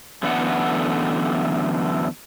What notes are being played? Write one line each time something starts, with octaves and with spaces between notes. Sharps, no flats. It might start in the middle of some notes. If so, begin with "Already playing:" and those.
F#2 D3 E3 A3 B3 F#5